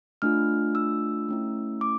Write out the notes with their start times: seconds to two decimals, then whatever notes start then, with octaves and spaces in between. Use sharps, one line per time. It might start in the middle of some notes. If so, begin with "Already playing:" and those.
0.22 A3 D4 F4 F6
0.75 E6
1.29 A3 C#4 E4
1.81 D6